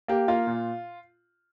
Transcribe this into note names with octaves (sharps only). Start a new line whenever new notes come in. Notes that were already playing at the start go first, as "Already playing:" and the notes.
A#3 G4
A#3 F4
A#2